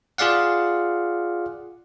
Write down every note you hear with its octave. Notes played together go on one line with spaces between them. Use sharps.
F4 G#4 D5 F5 F#5